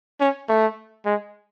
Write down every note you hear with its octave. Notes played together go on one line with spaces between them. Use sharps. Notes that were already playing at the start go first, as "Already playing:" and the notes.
C#4
A3
G#3